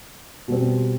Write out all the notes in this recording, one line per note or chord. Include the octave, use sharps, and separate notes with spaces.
B2 G3 C4